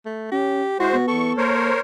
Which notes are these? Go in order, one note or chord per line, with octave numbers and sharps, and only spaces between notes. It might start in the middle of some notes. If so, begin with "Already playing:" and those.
A3
C#4 G4
G#3 E4 F#4 C5
B3
E2 A4 C#6
A#3 A#4 C5 C#5